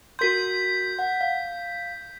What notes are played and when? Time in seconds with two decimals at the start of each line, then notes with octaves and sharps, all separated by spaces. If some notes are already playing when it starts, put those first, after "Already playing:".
0.19 F#4 A#4 C6 G6 B6
0.99 F#5
1.21 F5